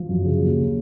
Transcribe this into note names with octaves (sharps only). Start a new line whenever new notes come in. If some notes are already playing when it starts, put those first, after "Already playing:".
Already playing: F3
F#2
C#3
D#2